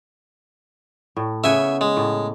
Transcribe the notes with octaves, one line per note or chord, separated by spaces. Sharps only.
A2
C#3 B3 E5 F#5 G#5
G#3
A2